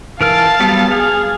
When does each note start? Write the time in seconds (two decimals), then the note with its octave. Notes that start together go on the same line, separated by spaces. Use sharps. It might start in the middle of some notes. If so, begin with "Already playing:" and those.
0.21 E3 A#4 F5 A5 F6
0.60 F#3 G3 B3
0.92 G#4 F5